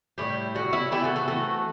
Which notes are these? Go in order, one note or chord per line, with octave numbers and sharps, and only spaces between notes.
A2 E3 G3 E4 G4
A2 E3 G3 F#4
E4
E3 A3 C4 E4 G4
F#4 A4
F#4 A4
E3 A3 C4 F#4 A4